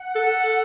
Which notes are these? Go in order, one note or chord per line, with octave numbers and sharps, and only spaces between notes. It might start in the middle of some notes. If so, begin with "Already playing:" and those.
Already playing: F#5
A4